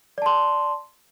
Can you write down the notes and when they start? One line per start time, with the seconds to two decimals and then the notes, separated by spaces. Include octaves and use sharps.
0.18 D5
0.22 A5
0.26 C6